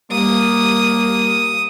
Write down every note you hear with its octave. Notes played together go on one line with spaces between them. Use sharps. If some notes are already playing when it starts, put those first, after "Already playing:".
G3 A#3 D#6